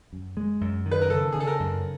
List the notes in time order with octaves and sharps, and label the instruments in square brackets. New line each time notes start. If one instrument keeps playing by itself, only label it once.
[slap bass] F#2
G#3
F#2
D#3
[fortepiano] B4
A#4
[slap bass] C#3 [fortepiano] A4
[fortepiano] G#4
[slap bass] C#3
[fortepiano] A4
A#4
[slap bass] F#2